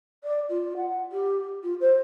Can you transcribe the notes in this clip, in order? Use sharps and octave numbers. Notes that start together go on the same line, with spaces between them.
D5
F4
F#5
G4
F4
C5